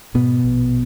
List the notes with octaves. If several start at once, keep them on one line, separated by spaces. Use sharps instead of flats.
G#2 B2 B3
A#1